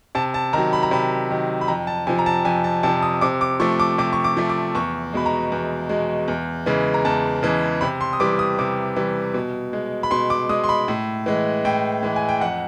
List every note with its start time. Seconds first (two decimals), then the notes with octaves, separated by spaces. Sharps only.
0.15 C3 A5
0.34 A5
0.53 D#3 A#5
0.58 F#3
0.73 B5
0.83 A#5
0.91 C3 B5
1.30 D#3 F#3
1.61 B5
1.68 F2 A#5
1.87 A5
2.07 C3 F3 G#5
2.19 A#5
2.26 A5
2.45 F2 G#5
2.64 A5
2.83 C3 F3 A5
3.02 D#6
3.21 C3 D6
3.41 D6
3.60 F3 A3 C#6
3.79 D6
3.98 C3 D6
4.13 C#6
4.24 D6
4.37 F3 A3
4.49 D6
4.75 E2 C#6
5.13 B2 G#3 B5
5.26 A#5
5.52 E2
5.89 B2 G#3
6.28 E2
6.66 C#3 E3 G#3
6.94 A#5
7.05 E2 A5
7.43 C#3 E3 G#3
7.81 C3 B5
8.01 C6
8.13 D#6
8.20 E3 G3 D6
8.39 D#6
8.59 C3 D6
8.96 E3 G3
9.34 B2
9.73 G#3
10.03 B5
10.11 B2 C6
10.30 D6
10.49 G#3 D#6
10.64 C6
10.69 B5
10.88 A2
11.26 E3 G#3
11.65 A2 G5
12.03 E3 G#3
12.16 G#5
12.29 G5
12.41 F2 F#5